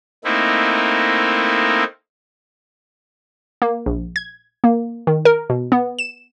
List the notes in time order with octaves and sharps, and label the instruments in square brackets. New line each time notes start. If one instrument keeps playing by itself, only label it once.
[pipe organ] A3 A#3 C4 D#4 E4
[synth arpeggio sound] A#3
A#1
G#6
A#3
D#3
A#4
B2
B3
E7